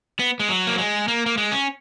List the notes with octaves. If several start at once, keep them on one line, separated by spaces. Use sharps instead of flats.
B3
G#3
F#3
A#3
G#3
A#3
A#3
G#3
C#4